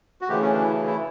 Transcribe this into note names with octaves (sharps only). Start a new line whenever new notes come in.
F#4
D2 C#3 E3 A3 G4
C#4
D4
E4
E4